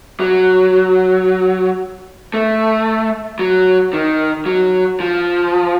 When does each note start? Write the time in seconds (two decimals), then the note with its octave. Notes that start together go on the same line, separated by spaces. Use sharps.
0.20 F#3
2.34 A3
3.39 F#3
3.93 D#3
4.46 F#3
5.00 F3